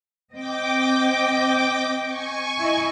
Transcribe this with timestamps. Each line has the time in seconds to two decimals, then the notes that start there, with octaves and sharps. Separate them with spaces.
0.33 C4 D#5 G5 D6
2.05 G#5 C#6
2.59 E4 D#5